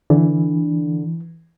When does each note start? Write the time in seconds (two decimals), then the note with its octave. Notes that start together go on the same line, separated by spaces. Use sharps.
0.10 D3 E3